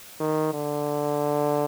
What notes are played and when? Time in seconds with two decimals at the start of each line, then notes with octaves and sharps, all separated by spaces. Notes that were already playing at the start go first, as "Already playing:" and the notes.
0.20 D#3
0.53 D3